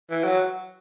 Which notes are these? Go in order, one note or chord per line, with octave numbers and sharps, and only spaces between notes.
E3
F#3